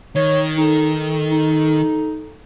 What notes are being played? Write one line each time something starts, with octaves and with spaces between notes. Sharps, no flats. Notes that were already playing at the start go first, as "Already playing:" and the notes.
D#3 C#5
D#4 A4
D#4